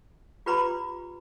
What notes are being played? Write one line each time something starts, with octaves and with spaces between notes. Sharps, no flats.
F4 G4 B4 A#5 B5 D6